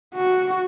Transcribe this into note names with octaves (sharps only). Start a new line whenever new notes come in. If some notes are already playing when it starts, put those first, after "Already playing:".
F#4